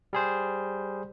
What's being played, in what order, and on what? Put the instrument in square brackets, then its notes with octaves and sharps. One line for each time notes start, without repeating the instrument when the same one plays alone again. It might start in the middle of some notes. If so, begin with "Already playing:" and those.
[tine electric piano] G3 G#4 C5